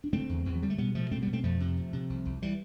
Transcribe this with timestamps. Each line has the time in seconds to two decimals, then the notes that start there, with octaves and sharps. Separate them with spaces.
0.04 D4
0.13 D3 A3 C4
0.29 E2
0.45 E2 E3
0.54 F3
0.62 D3 G3
0.70 A3
0.78 B2 G3 B3
0.95 B2 F3 A3
1.11 B2 A3 C4
1.22 G3 B3
1.27 B2
1.33 A3 C4
1.43 F2 F3 A3
1.60 C3
1.77 C3
1.93 C3
2.10 C2
2.26 C2
2.42 E3 G3